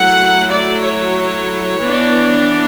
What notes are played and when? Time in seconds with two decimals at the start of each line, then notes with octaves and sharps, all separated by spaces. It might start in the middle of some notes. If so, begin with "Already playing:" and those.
Already playing: F#3 A3 E4 F#5
0.51 D5
0.84 C#5
1.80 E3 B3 D4